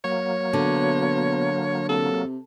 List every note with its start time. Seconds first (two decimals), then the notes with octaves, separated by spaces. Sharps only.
0.04 F#3 A#3 C#5
0.53 B2 D3
1.89 C3 A4